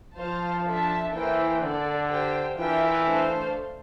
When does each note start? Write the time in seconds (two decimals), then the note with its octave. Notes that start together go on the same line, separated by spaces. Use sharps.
0.18 F3 F4 C5 F5 A5
0.66 D4 A4 E5 A5
1.14 E3 A#3 E4 A4 C5 G5
1.62 D3 D4 A4 D5
2.09 G4 C5 G5
2.57 E3 D4 F4 A#4 E5 G5
3.05 A3 D4 A4 C5 F5